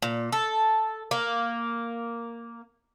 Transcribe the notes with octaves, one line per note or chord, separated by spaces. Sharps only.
A#2
A4
A#3